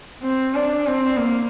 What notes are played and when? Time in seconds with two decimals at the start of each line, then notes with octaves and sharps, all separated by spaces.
0.23 C4
0.55 D4
0.87 C4
1.17 A#3